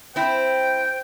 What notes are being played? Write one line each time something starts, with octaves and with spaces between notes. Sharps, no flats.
C4 E4 C5 G5